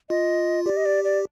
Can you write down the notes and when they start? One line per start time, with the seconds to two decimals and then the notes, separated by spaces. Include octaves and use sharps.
0.09 F4 D#5
0.66 G4 D5
0.77 D#5
0.85 D5
1.04 D5